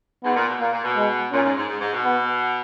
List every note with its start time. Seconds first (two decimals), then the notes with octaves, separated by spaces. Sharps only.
0.24 G#2 B3
0.36 A#2
0.48 B2
0.61 A#2 A#3
0.73 A#2
0.84 B2
0.96 G#3
1.32 A#2 C#4
1.45 G#2
1.57 G#2
1.68 G#2
1.81 G#2
1.93 B2
2.05 B3